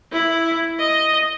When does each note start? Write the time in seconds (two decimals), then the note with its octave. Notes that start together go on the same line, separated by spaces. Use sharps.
0.12 E4
0.80 D#5